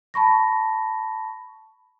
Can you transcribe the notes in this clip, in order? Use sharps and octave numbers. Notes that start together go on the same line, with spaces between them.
A5 B5 C#6 A#6